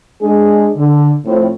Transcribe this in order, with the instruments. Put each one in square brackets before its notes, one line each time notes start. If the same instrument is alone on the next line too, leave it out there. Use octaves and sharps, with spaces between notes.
[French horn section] G#3 D4 G#4
D3
A2 F3 C4